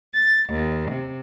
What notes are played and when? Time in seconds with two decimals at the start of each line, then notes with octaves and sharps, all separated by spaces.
0.14 A6
0.50 D#2
0.92 C3